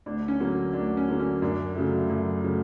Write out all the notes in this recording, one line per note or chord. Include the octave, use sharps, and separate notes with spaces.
D2 D4
C#4
D3 F#3 A#3
D2 D4
C#4
D3 F#3 A#3
C#4
F#2 D4
C#3 F#3 A3
F#2
C#3 F#3 A3